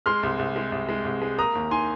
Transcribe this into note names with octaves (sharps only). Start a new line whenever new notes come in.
G#3 C6 F6
C2
C2
G#3
C2
G#3
C2
G#3
A#3 A#5 D#6
D#2
D#3 G#5 C6